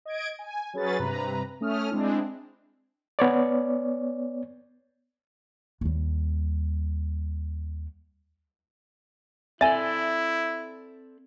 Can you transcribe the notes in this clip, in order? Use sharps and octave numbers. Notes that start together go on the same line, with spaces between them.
D#5 G#6 D7
G#5
F#3 C#4 G#4 B4 A6
G2 C3 B4 A#5
A3 C#4 D#6 F6
G#3 C4 D4 E4
B3 C#5 D5
D#2 G3
C4 E4 A4 D5 E5 G#5 A6